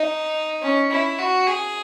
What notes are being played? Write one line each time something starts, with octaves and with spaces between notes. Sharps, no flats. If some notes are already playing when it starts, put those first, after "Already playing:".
Already playing: D#4
C#4
E4
F#4
G#4